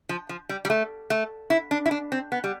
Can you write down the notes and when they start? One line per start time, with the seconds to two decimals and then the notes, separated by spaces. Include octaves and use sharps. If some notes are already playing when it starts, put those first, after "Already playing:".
0.09 F3
0.29 F3
0.49 G3
0.65 G3
0.70 A3
1.10 A3
1.50 E4
1.71 D4
1.86 E4
1.91 D4
2.12 C4
2.32 B3
2.44 G3